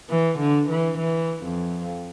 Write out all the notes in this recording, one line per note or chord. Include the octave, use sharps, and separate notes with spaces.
E3
D3
E3
E3
F2